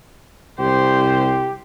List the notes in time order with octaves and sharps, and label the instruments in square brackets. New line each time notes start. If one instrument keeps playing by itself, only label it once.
[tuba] C2 [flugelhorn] G4 [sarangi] C5